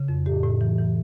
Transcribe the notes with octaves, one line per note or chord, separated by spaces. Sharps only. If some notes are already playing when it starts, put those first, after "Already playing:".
Already playing: C#3
F2
A2 G4
A2
E3
E3